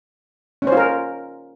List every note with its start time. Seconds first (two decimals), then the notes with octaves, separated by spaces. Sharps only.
0.62 C#4
0.67 C5
0.72 F4
0.77 A#4